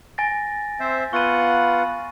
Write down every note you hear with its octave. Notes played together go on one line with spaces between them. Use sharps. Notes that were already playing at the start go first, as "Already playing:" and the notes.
G#5 A6 A#6
C4 C5 E5
B3 F4 F#5 C#6 D#7